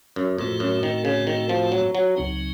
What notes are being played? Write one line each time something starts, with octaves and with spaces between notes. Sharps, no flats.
F#2
F2 A2 A3 C4 F#4
F#2
D#3
C#3
D#3
F3
F#3
F#3
C#2 C#3 F#3 C4 D#4